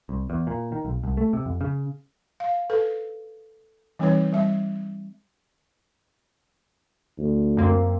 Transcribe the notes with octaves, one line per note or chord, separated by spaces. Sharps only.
C2
E2
A#2
D#3
B1
C2
A3
C3
F2
C#3
F5
A4 B4
E3 G3 C4 D#4 B4 C#5
G3 E5
D2
F#2 A#3 C4